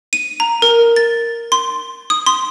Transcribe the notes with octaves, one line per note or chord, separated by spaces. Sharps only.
D#7
A#5
A#4
A6
C6
D#6
C6